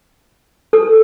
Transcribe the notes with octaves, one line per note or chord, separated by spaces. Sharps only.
A4